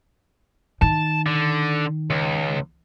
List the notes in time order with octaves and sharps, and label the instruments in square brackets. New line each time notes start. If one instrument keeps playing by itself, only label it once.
[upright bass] D#3 [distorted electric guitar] A5
[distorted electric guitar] D3
C#2